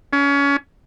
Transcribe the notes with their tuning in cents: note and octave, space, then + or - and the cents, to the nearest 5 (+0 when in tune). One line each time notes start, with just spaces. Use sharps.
C#4 +25